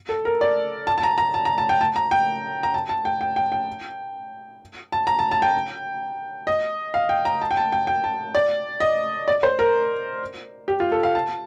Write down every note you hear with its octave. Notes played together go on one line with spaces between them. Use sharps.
A4
A#4
D5
A5
A5
A#5
A#5
A5
A#5
A5
G5
A5
A#5
G5
A#5
A5
A5
G5
G5
G5
G5
A5
A#5
A5
A5
G5
D#5
F5
G5
A#5
A5
G5
A5
G5
G5
A5
D5
D#5
D5
C5
A#4
G4
F4
A4
F5
A5